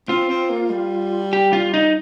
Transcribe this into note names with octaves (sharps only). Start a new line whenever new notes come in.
C4 F4
C4
A#3
G3
G4
F4
D#4